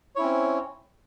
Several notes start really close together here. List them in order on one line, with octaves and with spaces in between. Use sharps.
C#5 E4 C#4 C4